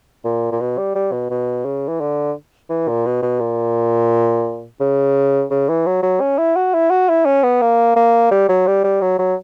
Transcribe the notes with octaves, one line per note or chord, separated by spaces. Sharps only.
A#2
A#2
B2
G3
G3
B2
B2
C#3
E3
D3
E3
A#2
B2
B2
A#2
C#3
C#3
E3
F#3
F#3
C#4
E4
F#4
E4
F#4
E4
C#4
B3
A#3
A#3
G3
F#3
G3
G3
F#3
F#3